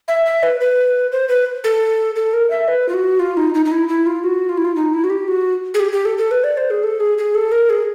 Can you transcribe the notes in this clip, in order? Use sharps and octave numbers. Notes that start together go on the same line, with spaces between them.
E5
E5
B4
B4
C5
B4
A4
A4
A#4
E5
B4
F4
F#4
F4
D#4
D#4
D#4
E4
E4
F4
F#4
F4
E4
F4
D#4
E4
F#4
G4
F#4
G#4
G4
G4
A4
A4
B4
D5
C5
G#4
A4
G#4
G#4
A4
A#4
G#4